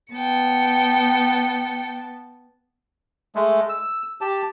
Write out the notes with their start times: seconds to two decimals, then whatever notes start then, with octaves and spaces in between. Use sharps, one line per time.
0.13 B3 G5 A5 C#7
3.35 G#3 A3
3.69 E6
4.21 G4 A5